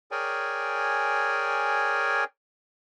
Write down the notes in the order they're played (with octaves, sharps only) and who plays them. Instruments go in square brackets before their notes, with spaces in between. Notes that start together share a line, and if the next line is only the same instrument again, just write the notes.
[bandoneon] G#4 A#4 C#5 D5 G5 G#5